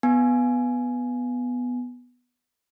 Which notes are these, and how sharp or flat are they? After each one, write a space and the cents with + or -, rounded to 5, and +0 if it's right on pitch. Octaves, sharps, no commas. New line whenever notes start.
B3 +0 G#5 +10